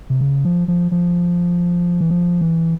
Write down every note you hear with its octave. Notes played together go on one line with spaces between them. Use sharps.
C3
C#3
F3
F3
F3
E3
F3
E3